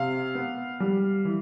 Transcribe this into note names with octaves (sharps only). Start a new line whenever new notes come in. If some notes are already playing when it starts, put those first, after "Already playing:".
Already playing: C3 F5
B3
G3
E3